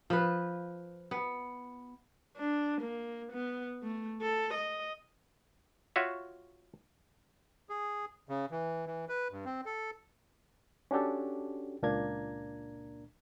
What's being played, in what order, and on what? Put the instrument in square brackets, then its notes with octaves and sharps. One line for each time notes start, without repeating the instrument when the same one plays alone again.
[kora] F3 B4
B3
[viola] D4
A#3
B3
A3
A4
D#5
[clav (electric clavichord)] F4 F#4 C#5 E5
[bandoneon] G#4
C#3
E3
E3
B4
G2
C4
A4
[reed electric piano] C#4 D4 F#4 G4 A4
C#2 A#2 A#3 D4 A#5 G#6